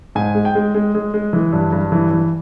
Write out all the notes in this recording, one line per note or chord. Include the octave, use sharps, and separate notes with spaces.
G#2 G#5
G#3
G5
G#3
G#3
G#3
G#3
E3
G2
G2
E3
E3